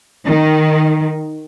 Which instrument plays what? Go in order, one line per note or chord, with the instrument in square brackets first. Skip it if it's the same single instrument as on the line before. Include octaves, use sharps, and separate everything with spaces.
[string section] D#3